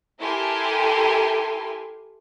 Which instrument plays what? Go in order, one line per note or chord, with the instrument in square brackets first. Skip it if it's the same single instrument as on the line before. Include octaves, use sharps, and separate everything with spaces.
[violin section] E4 G4 A4 A#4 G#5 C6